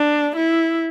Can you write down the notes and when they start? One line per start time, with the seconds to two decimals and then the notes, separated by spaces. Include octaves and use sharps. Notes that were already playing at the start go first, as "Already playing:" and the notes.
Already playing: D4
0.36 E4